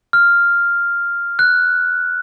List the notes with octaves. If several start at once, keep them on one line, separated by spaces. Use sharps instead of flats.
F6
F#6